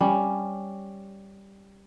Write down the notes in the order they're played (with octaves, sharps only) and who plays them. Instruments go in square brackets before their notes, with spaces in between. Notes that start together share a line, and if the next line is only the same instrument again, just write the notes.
[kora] G3 C#4